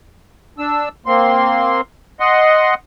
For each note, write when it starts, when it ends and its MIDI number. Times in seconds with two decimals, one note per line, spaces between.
0.59 0.89 62
0.59 0.89 88
1.06 1.81 58
1.06 1.81 60
1.06 1.81 84
2.20 2.74 75
2.20 2.74 78
2.20 2.74 84